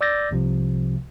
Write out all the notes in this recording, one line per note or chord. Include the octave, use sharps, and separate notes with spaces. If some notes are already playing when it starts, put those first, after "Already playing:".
D5 D6 E6 G6 A6 A#6
C2 C3 F3